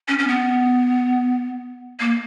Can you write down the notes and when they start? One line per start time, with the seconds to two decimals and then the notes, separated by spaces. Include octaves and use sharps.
0.08 C#4
0.19 C#4
0.28 B3
2.00 A#3